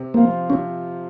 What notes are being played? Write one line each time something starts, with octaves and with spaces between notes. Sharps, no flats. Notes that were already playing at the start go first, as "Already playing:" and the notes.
Already playing: C3
F3 A#3 C4 F4
C3 C#4